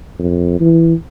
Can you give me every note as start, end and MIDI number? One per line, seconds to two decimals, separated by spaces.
0.19 0.59 41
0.60 0.94 52